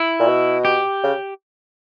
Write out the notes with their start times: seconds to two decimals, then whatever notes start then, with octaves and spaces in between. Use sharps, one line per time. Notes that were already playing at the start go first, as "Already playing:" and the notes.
Already playing: E4
0.19 A#2
0.27 B2
0.65 G4
1.04 C#3